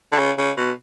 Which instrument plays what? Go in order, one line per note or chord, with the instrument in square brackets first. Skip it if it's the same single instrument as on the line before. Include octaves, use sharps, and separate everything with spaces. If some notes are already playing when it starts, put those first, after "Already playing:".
[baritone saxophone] D3
C#3
C#3
B2